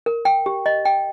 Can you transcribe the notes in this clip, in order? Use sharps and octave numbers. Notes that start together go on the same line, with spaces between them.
A#4
G5
G4
D#5
G5